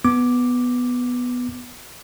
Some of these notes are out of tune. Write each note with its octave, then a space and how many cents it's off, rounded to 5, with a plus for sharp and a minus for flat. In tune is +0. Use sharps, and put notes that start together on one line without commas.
B3 +0 D6 +0